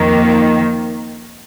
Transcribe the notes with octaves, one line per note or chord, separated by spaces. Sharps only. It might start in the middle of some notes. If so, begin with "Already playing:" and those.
Already playing: F2 D#3 A#3